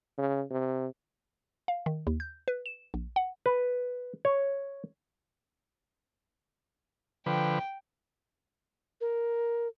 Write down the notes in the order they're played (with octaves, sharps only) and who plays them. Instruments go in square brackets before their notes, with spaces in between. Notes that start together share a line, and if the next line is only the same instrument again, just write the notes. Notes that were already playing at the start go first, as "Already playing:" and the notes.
[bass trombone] C#3
C3
[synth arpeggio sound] F5
D#3
D#2
G6
B4
E7
A#1
F#5
[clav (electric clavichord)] B4
C#5
[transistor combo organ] D3 F3 B4 [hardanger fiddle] G5
[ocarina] A#4